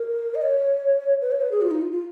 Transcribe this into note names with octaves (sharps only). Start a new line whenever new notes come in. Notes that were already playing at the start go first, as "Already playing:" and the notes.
Already playing: A#4
D#5
C#5
B4
C#5
B4
G#4
F4
D#4
F4
F4